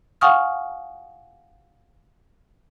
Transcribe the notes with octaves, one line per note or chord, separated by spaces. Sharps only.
F5 F#5 G#5 C#6 D#6 F6